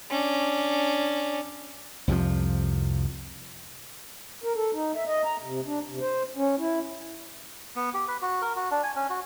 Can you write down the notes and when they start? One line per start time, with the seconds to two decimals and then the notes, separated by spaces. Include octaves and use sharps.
0.10 C#4 D4
2.08 C2 F2 C3 F3
4.44 A#4
4.55 A4
4.73 D#4
4.95 E5
5.07 D#5
5.25 A#5
5.42 C3
5.66 D4
5.87 C3
6.00 C5
6.36 C#4
6.59 E4
7.76 B3
7.94 G4
8.08 B4
8.22 F#4
8.42 A#4
8.56 F#4
8.71 D4
8.83 G#5
8.96 C#4
9.10 F#4